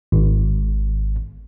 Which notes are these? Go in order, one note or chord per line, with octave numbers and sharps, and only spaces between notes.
G#1